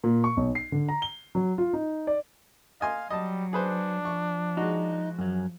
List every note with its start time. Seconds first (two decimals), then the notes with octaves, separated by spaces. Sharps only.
0.04 A#2
0.24 C#6
0.37 B1
0.55 C7
0.72 D3
0.89 A#5
1.02 G7
1.35 F#3
1.58 F4
1.73 D#4
2.07 D5
2.81 D#5 F5 G#5 C6
3.10 F#3 G3 D#5 A5
3.53 D4 G#4 B4 C5
4.05 F3 C#6
4.57 G#3 D#4 F#4
5.19 F#2 F#3